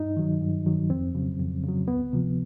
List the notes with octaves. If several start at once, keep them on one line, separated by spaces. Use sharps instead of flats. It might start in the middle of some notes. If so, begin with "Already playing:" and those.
Already playing: G2 D#4
D#3 F#3
G2
D#3 F#3
F2 C4
C#3 F#3
F2
C#3 F#3
D2 B3
C3 F3